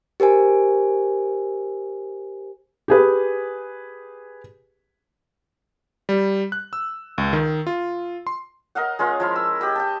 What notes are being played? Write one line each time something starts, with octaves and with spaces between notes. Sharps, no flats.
G4 A#4 C5 G#5
G4 G#4 B4
G3
F#6
E6
C#2
D#3
F4
C6
A#4 D#5 F5 F#5
G#3 C#4 F4 A#4
F3 E4 F5
E6
G4 D#5 B5
G5 A5